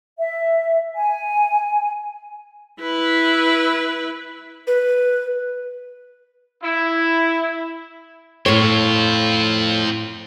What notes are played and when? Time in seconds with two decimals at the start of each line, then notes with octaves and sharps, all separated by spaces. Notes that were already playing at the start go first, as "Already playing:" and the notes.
0.19 E5
0.95 G#5
2.81 E4 B4
4.67 B4
6.63 E4
8.46 A2 C4 F4 C#5